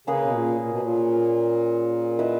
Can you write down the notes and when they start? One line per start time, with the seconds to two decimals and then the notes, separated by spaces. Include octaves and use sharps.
0.07 C#3 A#3 C#4 G#4 B4
0.24 B2
0.34 A#2
0.60 A#2
0.71 B2
0.81 A#2
2.19 E4 B4 D#5